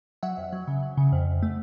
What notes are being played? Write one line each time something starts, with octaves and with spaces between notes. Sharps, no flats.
F#3 E5 F#5
F2
F#3
C#3
F#3
C#3
F2
F2
A3